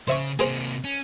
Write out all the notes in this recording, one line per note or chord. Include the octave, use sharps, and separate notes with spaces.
C#3 C5 E5 C#6
C3 A#3 G#4 B4 C5
C#4